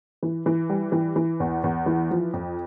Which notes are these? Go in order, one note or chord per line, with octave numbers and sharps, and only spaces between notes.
E3
E3
G3
E3
E3
E2
E2
E3
F3
F2